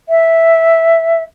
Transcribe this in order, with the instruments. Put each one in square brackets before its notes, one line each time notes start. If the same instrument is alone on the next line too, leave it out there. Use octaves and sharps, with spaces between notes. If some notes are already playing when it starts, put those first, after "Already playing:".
[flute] E5